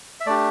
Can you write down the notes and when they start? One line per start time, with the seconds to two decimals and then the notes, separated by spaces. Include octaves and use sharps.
0.20 E5
0.26 A3 D4 G4 D5